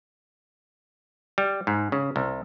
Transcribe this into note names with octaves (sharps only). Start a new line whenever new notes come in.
G3
G#2
C#3
C2